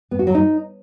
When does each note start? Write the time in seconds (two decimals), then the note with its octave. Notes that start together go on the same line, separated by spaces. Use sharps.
0.11 B3
0.19 F#4
0.27 F#3
0.35 D#4